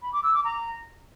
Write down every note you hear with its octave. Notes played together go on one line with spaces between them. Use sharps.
B5
D6
E6
D6
A#5